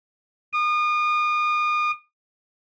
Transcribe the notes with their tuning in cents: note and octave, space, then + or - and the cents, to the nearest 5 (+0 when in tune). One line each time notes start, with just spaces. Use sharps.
D#6 -35